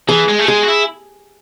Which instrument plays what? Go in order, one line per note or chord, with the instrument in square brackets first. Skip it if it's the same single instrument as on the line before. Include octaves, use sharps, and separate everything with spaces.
[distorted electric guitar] E3 [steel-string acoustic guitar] G#4
[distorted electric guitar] G#3
A3
[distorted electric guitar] G#3 [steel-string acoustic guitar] G#4
[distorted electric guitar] F#4
E4